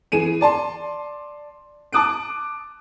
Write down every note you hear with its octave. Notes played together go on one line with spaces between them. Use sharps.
E3 G#4 D#7 E7
D5 A5 C6
A5 D6 D#6 F#6 D7